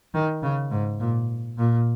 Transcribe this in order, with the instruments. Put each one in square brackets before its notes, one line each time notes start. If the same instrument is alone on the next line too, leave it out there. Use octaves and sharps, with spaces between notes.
[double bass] D#3
C#3
G#2
A#2
A#2